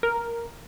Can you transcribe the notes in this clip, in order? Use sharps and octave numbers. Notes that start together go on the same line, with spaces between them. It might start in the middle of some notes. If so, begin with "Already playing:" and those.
A#4